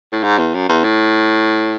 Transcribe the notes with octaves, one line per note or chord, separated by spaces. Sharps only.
A2
G#2
E2
F#2
E2
A2